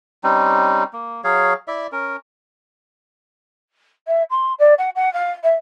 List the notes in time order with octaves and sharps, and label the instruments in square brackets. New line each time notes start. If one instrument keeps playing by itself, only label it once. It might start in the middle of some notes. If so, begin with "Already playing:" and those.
[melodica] G3 C4 C#4 D#4
A#3
F#3 G#4 C#5 F5
E4 D5 E5
C#4 A#4
[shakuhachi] E5
C6
D5
F#5
F#5
F5
E5